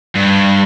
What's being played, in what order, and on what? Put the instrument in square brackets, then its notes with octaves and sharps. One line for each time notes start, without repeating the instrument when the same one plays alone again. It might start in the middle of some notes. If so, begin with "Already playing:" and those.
[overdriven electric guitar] G2